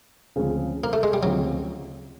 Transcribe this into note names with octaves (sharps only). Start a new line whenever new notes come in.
D2 C#3 F3 G#3 C4
A#3
A3
G#3
G3
D2 C#3 F3 F#3 G#3 C4